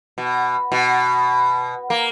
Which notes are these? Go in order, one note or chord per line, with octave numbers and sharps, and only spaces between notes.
B2
B2
A#3